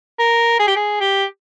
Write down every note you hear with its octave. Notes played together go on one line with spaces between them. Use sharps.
A#4
G#4
G4
G#4
G4